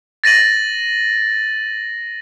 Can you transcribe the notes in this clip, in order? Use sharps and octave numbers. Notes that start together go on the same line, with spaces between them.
A6 A#6 D#7 F#7